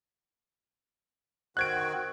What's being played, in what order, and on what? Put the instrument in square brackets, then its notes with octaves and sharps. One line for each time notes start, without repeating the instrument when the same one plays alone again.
[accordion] D#3 C4 F#4 [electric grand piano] F#6 G#6 D7